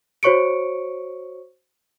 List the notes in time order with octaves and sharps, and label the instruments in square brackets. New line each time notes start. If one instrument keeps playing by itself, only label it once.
[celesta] F#4 C5 C#5 C#6 C#7 D7